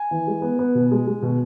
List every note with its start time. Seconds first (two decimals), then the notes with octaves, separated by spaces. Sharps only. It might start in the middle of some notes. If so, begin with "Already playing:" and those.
Already playing: G#5
0.11 E3
0.27 G#3
0.42 B3
0.59 B3
0.75 B2
0.91 G#3
1.07 G#3
1.22 B2